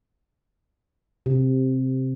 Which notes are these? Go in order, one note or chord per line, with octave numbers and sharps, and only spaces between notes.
C3